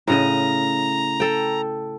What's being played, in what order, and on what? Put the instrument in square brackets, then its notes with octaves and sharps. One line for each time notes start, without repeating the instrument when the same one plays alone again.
[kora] A2 C#3 D#5 [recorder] A#5
[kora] A4 G5